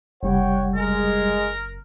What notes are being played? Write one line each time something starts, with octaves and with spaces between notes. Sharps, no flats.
F#1 C2 G3 C#5 F#5 G5
G#3 A#4